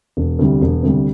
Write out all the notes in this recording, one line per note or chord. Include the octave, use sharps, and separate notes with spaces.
E1
D2 C3 G3
E1
D2 C3 G3